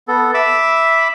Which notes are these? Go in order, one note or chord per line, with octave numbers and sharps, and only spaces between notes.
B3 A4
E5 B5 D6 E6